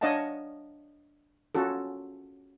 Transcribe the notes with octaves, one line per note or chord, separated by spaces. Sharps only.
D4 C#5 D#5 F5 F#5 A5
C#4 F4 F#4 A4